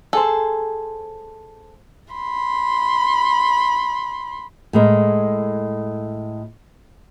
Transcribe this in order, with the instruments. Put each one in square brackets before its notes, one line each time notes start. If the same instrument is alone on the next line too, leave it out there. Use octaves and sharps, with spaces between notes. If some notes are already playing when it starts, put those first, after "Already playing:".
[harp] G#4 C5 [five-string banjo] A4
[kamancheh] B5 C6
[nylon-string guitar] A2 G#3 A#4